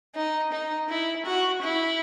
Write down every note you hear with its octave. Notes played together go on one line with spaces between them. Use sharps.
D#4
D#4
E4
F#4
E4